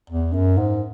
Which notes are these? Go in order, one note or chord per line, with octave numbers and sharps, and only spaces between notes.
E2
F#2
G#2